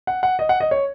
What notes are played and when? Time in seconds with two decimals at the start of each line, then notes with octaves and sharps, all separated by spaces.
0.07 F#5
0.23 F#5
0.39 D#5
0.49 F#5
0.60 D#5
0.71 C#5